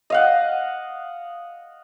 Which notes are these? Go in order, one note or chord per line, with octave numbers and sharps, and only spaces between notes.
D#5 F5 F#5